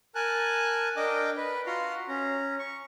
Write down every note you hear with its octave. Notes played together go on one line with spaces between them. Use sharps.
A#4 G#5 A5 F#6
D4 A#4 D#5 G5 D6
B4
F4 F#4 A#5 C6
C#4 A#5
C#6